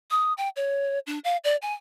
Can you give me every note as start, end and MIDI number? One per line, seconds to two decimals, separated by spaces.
0.11 0.33 87
0.38 0.49 79
0.56 0.99 73
1.07 1.19 62
1.24 1.37 77
1.44 1.56 74
1.62 1.73 80